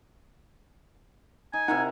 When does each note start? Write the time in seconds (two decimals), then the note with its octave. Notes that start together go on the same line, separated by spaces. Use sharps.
1.53 D#4 G#5
1.68 C3 D#4 E4 A#4 F#5